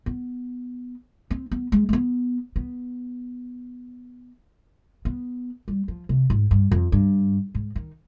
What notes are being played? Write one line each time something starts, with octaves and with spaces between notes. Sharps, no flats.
B3
C4
B3
G#3
G#3
B3
B3
B3
G3
F3
C3
G#2
G2
F2
G2
G#2
D#3